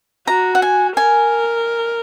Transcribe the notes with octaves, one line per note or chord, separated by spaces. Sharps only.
F#4 A#5
F#5
G#5
A#4 G#5